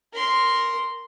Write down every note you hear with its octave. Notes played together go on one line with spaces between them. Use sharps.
A#4 C6